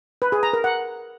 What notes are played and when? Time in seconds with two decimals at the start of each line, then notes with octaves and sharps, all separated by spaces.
0.22 B4
0.32 G#4
0.43 A#5
0.53 A#4
0.64 F#5